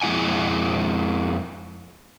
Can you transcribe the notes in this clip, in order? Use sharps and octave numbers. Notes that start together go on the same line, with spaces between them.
F2 G#3 A3 E4 F#5 G#5